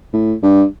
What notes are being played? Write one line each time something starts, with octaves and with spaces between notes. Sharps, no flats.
A2
G2